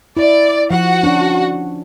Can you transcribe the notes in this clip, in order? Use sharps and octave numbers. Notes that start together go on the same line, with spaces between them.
E4 D5
F3 F#4 F#5
C#4 D4